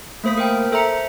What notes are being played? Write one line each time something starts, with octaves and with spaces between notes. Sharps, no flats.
A3 A#3 C5 D#6 B6
A#4 C5 G5
A4 C5 E5 A#5 C#7